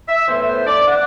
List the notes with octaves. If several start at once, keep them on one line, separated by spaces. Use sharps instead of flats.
E5
A2 E3 B3 C5
C5
D5
F#5